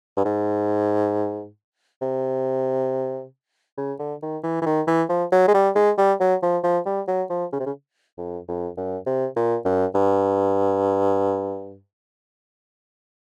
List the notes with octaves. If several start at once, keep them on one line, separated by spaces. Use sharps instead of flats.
G2
G#2
C3
C#3
D3
D#3
E3
E3
D#3
E3
F3
F#3
G#3
G3
G#3
G3
F#3
F3
F3
G3
F#3
F3
C#3
C3
C#3
F2
F2
F#2
C3
A#2
F#2
G2